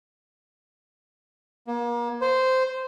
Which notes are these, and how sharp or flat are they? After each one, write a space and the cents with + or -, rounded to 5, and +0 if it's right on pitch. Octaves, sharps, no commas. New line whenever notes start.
A#3 +35
C5 -10